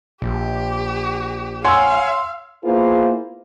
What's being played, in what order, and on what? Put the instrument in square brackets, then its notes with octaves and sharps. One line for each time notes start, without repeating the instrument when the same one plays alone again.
[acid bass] A#1 [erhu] G4
[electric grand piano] C#5 F#5 G#5 [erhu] F5 [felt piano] C6 E6
[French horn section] A#3 B3 E4 F4 G#4 C5